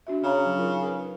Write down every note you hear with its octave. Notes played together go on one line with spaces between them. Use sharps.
D4 F#4 E5
C#3 C#5 F5 A#5
F#3
D#4 F4 A#4
A#4 B4